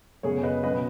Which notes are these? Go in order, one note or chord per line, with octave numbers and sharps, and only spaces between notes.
F#2 C#3 B3 G#4 C#5
B4 D#5
B2 F#3 C#4 B4 D#5